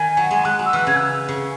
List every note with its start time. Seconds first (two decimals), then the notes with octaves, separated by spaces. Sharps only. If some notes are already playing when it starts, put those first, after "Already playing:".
Already playing: D#3 G#5
0.17 F#3
0.31 G#3
0.45 G#3 F#6
0.59 F#3
0.66 E6
0.73 E3 F#6
0.87 C#3 G#6
0.97 E6
1.29 C#3